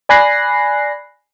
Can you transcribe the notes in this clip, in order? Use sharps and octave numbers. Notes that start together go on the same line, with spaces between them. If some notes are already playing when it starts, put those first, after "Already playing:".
D5 G#5 B5 F#6 A#6 C7